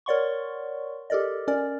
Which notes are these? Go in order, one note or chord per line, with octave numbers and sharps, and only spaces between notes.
A#4 C#5 D5 F#5 C6 C#6
G4 A4 A#4 D5 D#5
C#4 A#4 D5